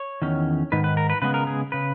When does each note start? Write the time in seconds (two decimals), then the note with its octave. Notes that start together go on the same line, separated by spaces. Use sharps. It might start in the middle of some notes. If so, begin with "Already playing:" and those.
Already playing: C#5
0.22 E2 D#3 C#4
0.72 G#2 D#3 B4
0.84 B4
0.97 A#4
1.10 B4
1.22 C#3 G#3 B3 B4
1.34 A#4
1.47 G#4
1.72 C#3 B4